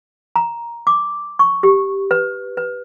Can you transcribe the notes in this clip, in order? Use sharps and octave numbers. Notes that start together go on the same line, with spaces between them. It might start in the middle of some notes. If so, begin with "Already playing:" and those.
A#5
D6
C#6
G4
B4
B4